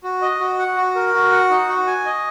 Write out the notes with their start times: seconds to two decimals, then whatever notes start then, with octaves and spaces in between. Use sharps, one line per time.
0.04 F#4
0.22 D#5
0.40 F#4
0.58 F#5
0.77 F#4
0.95 A#4
1.14 F#4
1.32 F#5
1.50 D#4
1.69 F#4
1.87 G#5
2.06 D#5